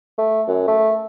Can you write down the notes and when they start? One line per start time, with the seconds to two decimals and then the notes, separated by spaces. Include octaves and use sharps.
0.18 A3
0.48 F#2
0.68 A3